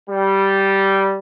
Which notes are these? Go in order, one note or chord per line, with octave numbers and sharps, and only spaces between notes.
G3